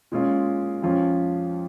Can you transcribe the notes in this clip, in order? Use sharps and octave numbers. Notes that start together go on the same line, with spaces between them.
A#2 G#3 C#4 F4
F2 F3 C#4 F4